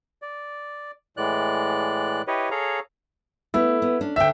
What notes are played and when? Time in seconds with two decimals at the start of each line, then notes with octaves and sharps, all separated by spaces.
0.22 D5
1.17 A2 E3 G#3 D5 F#6
2.28 E4 G4 B4 C#5 D#5
2.51 G#4 A4 C#5 F5 A#5
3.54 A3 B3 E4
3.82 B3
4.01 C#4 D4
4.16 D2 D3 E5 G5